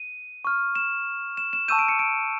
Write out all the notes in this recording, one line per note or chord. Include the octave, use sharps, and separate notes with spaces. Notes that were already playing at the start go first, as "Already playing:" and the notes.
Already playing: D#7
C#6 F6
E7
E7
E7
A5 C#6 E6 G6 D#7
D7
C#7
D7